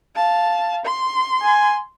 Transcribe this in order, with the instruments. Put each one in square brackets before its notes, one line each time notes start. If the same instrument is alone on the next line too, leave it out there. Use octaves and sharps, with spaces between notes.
[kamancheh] F5 A5
C6
[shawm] G#5